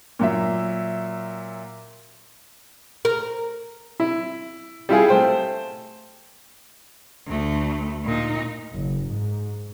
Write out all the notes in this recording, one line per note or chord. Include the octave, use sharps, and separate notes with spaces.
A#2 F#3 E5
A#4
E4
G3 E4 F4 G#4
A3 C5 G5
D2 A3
A#2 D#4
F#1
G#2